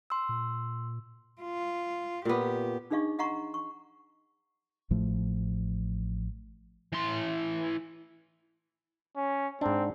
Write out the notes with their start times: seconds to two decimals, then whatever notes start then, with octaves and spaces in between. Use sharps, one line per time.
0.10 C6 E6
0.29 A#2
1.41 F4
2.25 A#2 B3 G4
2.91 D4 D#4 G#4 D#5 F5 C#6
3.19 D#5 F5 F#5 A#5 C6 C#6
3.54 C#6
4.90 A1 A2 F3 A3
6.93 E3 C6
9.16 C#4
9.61 G#2 C4 D4